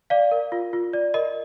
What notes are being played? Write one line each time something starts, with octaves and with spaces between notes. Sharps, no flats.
D5 F5
A#4
F4
F4
D5
A#4 D#5